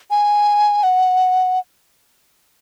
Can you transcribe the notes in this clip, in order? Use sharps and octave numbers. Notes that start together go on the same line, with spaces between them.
G#5
F#5